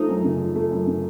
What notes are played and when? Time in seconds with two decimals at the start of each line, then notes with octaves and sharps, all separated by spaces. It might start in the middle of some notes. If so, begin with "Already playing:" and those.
Already playing: F3 A3 D#4
0.09 F#2
0.24 C#3
0.40 F3
0.56 A3
0.71 F#2
0.87 C#3